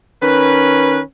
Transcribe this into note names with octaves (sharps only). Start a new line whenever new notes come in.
D#3 C#4 B4